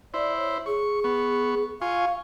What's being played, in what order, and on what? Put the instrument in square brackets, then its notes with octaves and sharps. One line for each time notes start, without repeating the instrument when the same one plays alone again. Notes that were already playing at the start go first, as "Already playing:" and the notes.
[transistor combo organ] E4 C5 [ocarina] D5
[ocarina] C#5
[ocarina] G#4 [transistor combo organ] C#6
[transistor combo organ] B3 C#6
[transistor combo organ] F4 G#5 C#6 [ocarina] F5